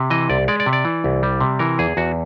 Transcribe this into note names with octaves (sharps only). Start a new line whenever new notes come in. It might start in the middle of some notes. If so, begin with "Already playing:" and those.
Already playing: C3
E3 D#5
C2 D5
G#3 D5
D5
C3
D5
E3
C2
G3
C3
E3 A#4
E2 G#4
E2 F#4